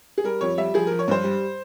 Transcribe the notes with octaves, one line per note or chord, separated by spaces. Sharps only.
G#4
G3 A#4
F2 C#5
G3 E5
F3 G#4
F3 A#4
C#5
G2 C5
G3